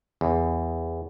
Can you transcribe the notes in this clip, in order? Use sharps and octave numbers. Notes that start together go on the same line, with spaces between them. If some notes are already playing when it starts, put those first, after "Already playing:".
E2